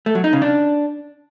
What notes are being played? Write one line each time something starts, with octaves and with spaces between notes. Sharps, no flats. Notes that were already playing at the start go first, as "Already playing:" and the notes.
A3
F#3
D#4
C#3
D4